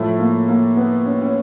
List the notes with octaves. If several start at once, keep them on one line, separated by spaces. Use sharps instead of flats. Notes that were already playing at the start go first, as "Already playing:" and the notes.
Already playing: A2 F3 A3
A#3
A#3
B3
C#4
C#4